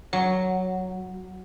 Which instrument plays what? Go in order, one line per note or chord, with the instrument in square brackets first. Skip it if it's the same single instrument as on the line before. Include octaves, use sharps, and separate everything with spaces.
[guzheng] F#3